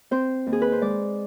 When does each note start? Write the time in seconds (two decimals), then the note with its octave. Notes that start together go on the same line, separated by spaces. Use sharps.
0.11 C4 C5
0.46 D#2
0.53 G#4
0.62 B4
0.72 C5
0.81 G#3 D5